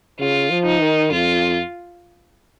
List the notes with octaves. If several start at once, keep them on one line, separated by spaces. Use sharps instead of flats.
C#3 F4
F3
D#4
D#3
F2 F4